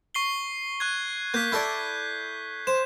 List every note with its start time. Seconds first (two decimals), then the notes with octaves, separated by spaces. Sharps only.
0.15 C#6 C7 G7
0.80 C#6 F#6 G#6
1.34 A#3 G6 B6
1.52 E4 A4 D5
2.67 C5 E7